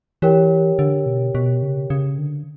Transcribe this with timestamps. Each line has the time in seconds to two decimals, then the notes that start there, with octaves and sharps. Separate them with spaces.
0.22 E3 G4 A#4 C#5 G5
0.79 D3
1.06 B2
1.35 B2
1.62 C#3
1.90 C#3
2.18 D3